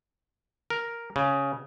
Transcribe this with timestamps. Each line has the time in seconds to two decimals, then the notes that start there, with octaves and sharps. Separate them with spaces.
0.70 A#4
1.16 C#3